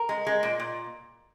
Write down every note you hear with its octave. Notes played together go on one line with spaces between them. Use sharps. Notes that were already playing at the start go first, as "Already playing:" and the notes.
Already playing: A#4
G#3
G#3
A#2
A#2